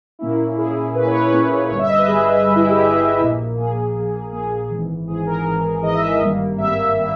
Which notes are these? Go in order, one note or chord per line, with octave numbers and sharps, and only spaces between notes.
A#2 A#3 C#4 E4
A#2 A#3 C#4 E4 G#4
A#2 A#3 C#4 E4 B4
C#5
B4
A#2 A#3 C#4 E4
G1 G2 G3 C#5
E5
D#5
B4
G1 G2 G3 G#4
G1 G2 G3
E4
G4
G1 G2 G3 G#4
A#1 A#2 A#3
A#1 A#2 A#3 G#4
A#1 A#2 A#3
A#1 A#2 A#3 G#4
G#1 G#2 E3
G#1 G#2 E3 G#4
A#4
G#1 G#2 E3 A#4
G#1 G#2 E3 D#5
E5
D#5
G#1 G2 G3 A#3
G#1 G2 G3 A#3 E5
G3 A#3